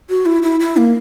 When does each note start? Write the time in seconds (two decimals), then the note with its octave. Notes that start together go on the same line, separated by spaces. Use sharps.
0.10 F#4
0.26 E4
0.43 E4
0.60 E4
0.77 A#3